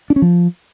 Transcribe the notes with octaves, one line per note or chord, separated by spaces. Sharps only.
D4
C#4
F3